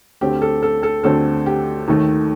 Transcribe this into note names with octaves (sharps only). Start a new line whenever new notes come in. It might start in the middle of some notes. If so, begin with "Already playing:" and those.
D2 D3 A3 C4 G4
A4
A4
A4
D2 D3 A3 C4 A4
G4
D#2 D#3 A3